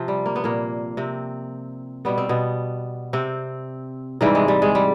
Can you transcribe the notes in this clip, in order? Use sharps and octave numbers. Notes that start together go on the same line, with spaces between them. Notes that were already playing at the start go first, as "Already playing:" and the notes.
Already playing: C3 F3
G3
A#3
B3
A#2 A#3
C3 C4
B2 G3 B3
C4
B2 B3
C3 C4
G#2 C3 E3 G3 C4
G#3
G3
G#3
G3